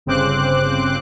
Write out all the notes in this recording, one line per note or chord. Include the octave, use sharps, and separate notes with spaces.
G1 C#3 C4 C5 D6 F#6